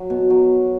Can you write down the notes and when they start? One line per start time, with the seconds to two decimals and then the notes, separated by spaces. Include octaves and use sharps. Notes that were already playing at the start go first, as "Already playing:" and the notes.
Already playing: F#3
0.10 B2
0.30 F#3